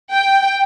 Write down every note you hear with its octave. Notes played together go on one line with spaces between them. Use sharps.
G5